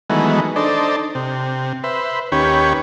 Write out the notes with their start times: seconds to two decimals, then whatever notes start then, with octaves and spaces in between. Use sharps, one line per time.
0.10 D#3 E3 F#3 G#3 A3 B3
0.56 D4 D#4 A4 C5 D5
1.15 C3
1.84 B4 C5 E5
2.32 D#2 C#4 G4 B4 C#5